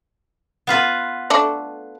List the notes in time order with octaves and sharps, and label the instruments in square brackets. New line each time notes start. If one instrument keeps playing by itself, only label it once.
[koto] B3 F4 B4
[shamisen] A3 D4 A4